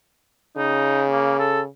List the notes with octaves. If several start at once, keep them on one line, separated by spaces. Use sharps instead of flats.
C#3 D#4
A#3
A4